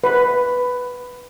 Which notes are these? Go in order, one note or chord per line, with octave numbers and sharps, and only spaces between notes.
B4